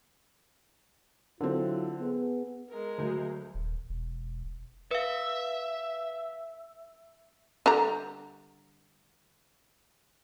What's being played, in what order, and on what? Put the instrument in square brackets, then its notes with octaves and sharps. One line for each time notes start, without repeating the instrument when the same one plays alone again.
[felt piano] D3 C4 [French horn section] F#3 E4 F4
[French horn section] B3 G#4
[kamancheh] G#3 A#4
[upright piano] D2 F#3
[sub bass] D#1
E1
[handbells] B4 F5 [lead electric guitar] E5
[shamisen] D3 G3 A#5